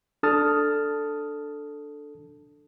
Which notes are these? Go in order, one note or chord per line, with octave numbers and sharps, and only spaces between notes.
D4 A4 A5 D#6 F6 A6